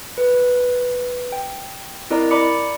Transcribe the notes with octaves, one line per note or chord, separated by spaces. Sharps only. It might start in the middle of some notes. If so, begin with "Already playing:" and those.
B4
G5
C4 E4 A#4 D5 D#5 A#5
D5 A#5 B5 D6 C#7